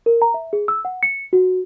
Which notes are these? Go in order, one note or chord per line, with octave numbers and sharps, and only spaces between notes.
A#4
A#5
E5
G#4
E6
F#5
C#7
F#4